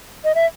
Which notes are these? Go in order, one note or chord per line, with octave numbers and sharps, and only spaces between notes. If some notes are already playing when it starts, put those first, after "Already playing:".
D#5
E5